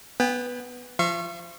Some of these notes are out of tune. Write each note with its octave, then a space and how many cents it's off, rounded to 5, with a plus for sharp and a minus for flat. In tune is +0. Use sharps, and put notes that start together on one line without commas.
B3 +0 G5 +40
F3 -20 F5 -45 C#6 -25